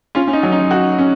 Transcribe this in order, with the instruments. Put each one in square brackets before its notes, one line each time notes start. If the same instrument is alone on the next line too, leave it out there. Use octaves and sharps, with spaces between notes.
[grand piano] C#4 [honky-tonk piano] F4
[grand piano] C#4
D#4
[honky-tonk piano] F#3
[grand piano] D#4
[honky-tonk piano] F#4
C#4